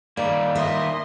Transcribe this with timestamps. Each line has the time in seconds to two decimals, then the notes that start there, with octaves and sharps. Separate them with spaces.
0.17 D#3 G3 A#3 D5
0.55 D#5 E5 C6